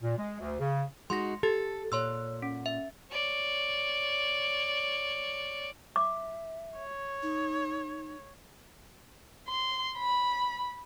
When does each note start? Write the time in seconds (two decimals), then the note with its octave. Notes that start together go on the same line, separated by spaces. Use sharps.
0.02 A#2
0.17 G#3
0.40 D2
0.60 C#3
1.10 G#3 D#4 F#4 C6 A#6
1.43 G4 A4 A6
1.92 A#2 C#5 C6 E6
2.42 C#4
2.66 E5
3.12 C#5 D5
5.96 E5 D6
6.78 C#5
7.23 D#4
9.48 C6
9.98 B5